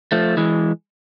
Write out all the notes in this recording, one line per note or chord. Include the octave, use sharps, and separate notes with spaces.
F3 A3
E3 G#3